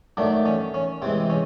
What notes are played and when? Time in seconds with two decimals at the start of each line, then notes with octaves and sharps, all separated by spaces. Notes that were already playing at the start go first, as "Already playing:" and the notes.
0.17 D#3 F#3 A3 D4
0.46 C#4
0.74 C#4
1.02 C3 E3 G#3 C4
1.30 C#4